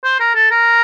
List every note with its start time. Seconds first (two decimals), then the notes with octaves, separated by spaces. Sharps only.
0.04 C5
0.20 A#4
0.35 A4
0.51 A#4